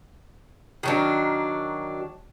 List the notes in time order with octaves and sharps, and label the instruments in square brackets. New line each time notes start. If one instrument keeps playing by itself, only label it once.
[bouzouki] D#3 F#3 D4